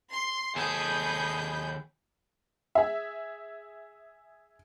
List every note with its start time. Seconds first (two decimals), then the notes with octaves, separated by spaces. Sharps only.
0.10 C6
0.56 D#2 G#4 A4 B5 G6
2.75 G#4 E5